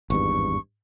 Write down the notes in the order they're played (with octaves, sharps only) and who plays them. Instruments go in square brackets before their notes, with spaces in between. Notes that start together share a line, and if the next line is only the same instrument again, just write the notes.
[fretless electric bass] G#1 E2 G2 [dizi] C#6